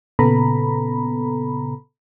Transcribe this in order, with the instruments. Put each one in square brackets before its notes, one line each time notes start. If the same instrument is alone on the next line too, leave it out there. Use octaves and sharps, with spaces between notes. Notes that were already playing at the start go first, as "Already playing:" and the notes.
[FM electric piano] A#2 C#3 B3 A4 A#5 B5